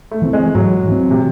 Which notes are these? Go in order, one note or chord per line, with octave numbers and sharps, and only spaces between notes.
A3
E3 C4
G#3
G#2 F#3
E3 C4
C3